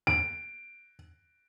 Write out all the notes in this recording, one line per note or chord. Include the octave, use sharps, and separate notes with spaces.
D7